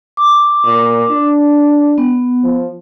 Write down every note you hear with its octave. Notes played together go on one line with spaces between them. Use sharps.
D6
A#2
D4
B3
F3